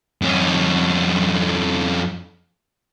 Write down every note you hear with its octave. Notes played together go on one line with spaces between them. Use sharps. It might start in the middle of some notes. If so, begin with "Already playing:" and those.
F2 C#4